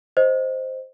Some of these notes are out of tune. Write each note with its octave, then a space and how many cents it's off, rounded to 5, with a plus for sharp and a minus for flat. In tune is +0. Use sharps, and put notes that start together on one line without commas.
C5 +0 D#5 +0